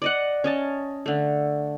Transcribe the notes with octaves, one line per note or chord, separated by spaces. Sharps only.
D5 D#5 F#5
C#4 D#5 A5
D3 A3